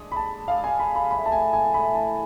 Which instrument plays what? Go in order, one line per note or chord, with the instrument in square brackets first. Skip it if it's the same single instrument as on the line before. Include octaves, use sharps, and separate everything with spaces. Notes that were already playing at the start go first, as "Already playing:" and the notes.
Already playing: [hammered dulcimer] G#3 D4 G#4
[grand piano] B5
A5
[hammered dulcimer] G#3 D4 G#4 [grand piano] F5
[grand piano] G#5
B5
B5
[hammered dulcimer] A2 E3 G#3 [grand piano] B5
[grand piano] A5
G#5
G#5
[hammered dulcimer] A2 E3 G#3 [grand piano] B5
[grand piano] A5